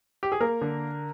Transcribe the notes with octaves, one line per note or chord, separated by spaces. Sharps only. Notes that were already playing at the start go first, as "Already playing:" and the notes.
G4
G#4
A#3 A#4
D3